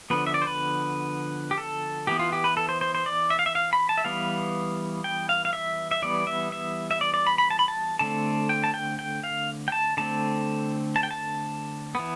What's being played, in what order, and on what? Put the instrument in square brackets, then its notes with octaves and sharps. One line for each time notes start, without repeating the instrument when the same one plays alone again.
[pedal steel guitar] D3 F3 B3 B4
E5
D5
C5
B4
G4
A4
E3 B3 G4
F4
G4
B4
A4
C5
C5
C5
D5
E5
F5
E5
F5
B5
A5
E5
E3 G3 B3 F5
G5
F5
F5
E5
E5
E3 G3 B3 D5
E5
E5
E5
D5
D5
B5
B5
A5
B5
A5
D3 A3 C4 A5
G5
A5
G5
G5
F5
G5
A5
D3 A3 C4 A5
A5
G5
A5
E3 B3